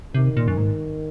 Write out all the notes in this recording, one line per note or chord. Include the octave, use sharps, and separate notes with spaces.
C3 D#3
A#2
F#2
G#2